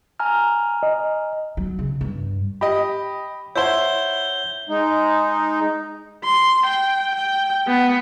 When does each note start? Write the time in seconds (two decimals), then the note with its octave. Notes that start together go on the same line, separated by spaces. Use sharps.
0.19 G#5 A#5 F6
0.83 D#5
1.57 F#3
1.79 C#3
2.01 G2
2.61 G4 D#5 B5
3.56 E4 C5 C#5 E5 F#5 G6 G7
4.69 G#3 D#4
6.25 C6
6.66 G5
7.15 G5
7.67 B3